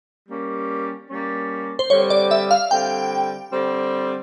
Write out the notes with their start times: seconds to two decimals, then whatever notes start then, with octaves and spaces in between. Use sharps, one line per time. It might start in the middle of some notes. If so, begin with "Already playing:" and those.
0.29 G3 A#3 C#4
1.10 G3 A#3 C#4
1.79 C5
1.90 D3 G3 C4 C#5
2.10 D5
2.31 E5
2.51 F5
2.71 D3 G3 C4 G5
3.52 D3 G3 C4